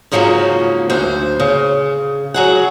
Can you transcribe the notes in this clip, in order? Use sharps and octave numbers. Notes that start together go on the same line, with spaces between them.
G#2 C#3 F3 F#3 A3 A#3
D2 C5
C#3
F#3 G#4 F#5